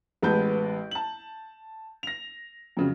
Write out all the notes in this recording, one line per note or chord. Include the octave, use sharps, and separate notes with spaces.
A1 G#3 B3 B4 A5 G6
A5 F#7
A#6 F7
F2 C#3 F#3